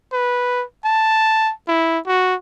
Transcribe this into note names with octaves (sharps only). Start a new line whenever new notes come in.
B4
A5
E4
F#4